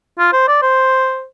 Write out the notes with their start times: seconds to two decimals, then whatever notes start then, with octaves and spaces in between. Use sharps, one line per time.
0.19 F4
0.33 C5
0.48 D5
0.62 C5